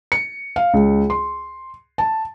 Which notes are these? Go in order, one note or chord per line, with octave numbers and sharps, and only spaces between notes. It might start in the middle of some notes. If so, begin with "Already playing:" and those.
C#7
F5
C#2
C6
A5